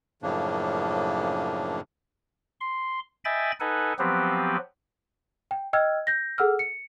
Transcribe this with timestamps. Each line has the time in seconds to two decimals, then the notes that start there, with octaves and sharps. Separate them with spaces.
0.22 F#2 A2 C#3 F3 A#3 D4
2.61 C6
3.25 D#5 E5 G5 G#5 B5 A6
3.60 D#4 A4 B4 F#5 G#5
3.99 F3 F#3 B3 C4 G4 B4
5.51 G5
5.73 D#5 G5 E6 F6 G#6
6.07 G6 A#6
6.38 G#4 A4 F#5 E6 F6
6.59 C#7